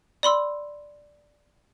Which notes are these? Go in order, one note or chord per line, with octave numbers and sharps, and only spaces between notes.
D5 B5 C6 E6